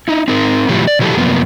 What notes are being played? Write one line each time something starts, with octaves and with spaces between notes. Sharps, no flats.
D#4 E4
C4 D#4 A#4
A2 C3 E3 F#3 F4 G4
D5
B2 E3 F#3 G4 A4
F#2 C3 F3 A#3 B3